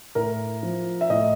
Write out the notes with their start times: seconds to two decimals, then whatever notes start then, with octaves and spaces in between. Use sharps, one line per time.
0.15 A2 A#4
0.63 F3
1.01 E5
1.10 A2 D#5